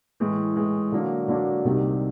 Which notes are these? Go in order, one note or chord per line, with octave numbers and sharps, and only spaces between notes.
A2 E3 G#3
A2 E3 G#3
D3 F#3 A#3 D4
D3 F#3 A#3 D4
C2 C3 D#3 G3